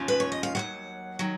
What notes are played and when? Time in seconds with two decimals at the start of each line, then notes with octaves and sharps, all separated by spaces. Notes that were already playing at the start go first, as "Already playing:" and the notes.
Already playing: D#2 C#3 F3
0.08 B4
0.20 C#5
0.32 D#5
0.43 F5
0.55 D#2 D#3 F#3 F#5
1.19 D#3 F#3